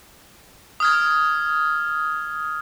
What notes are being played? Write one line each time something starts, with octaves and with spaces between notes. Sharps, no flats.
D#6 F6 G#6